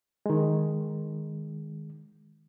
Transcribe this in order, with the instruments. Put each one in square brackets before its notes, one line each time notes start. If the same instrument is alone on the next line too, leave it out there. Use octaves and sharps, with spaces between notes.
[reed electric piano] D#3 G#3